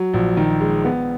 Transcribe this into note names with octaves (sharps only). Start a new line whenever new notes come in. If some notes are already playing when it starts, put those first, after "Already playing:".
Already playing: F#3
A#1
D#3
G#3
B3